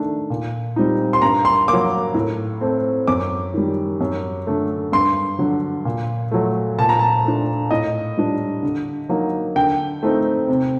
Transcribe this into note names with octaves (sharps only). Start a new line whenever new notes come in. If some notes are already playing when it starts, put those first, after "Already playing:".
Already playing: D#3 A3 D4
A#2
G3 C4 D#4
C6
G2 A#5
C6
F#3 A#3 D6
A2
A3 C4
F#2 D6
D#3 G3
F#2
D3 A3
G2 C6
D3 F#3
A#2
F#3 A3
A#2 A5
A#5
A5
A3 D4
A2 D#5
G3 D4
D3
F#3 A#3 D#4
D3 G5
A3 C4 D#4
C3